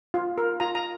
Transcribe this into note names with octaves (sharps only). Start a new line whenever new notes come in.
F4
A#4
F4 A#5
A#5